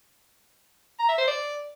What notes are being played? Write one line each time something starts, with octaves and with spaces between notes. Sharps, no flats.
A#5
E5
C5
D5